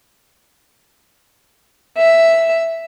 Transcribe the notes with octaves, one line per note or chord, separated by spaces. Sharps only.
E5